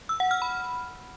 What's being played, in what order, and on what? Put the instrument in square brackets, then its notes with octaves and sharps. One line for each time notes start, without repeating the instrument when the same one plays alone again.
[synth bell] E6
F#5
F6
B5